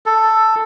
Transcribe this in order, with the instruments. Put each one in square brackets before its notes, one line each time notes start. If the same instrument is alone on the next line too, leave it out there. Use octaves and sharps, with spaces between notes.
[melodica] A4